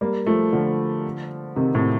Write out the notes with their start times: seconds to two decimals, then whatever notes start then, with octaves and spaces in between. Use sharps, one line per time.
0.01 G3 A#3
0.26 F3 A3
0.53 D3 F3
1.56 C3 D#3
1.75 A2 C3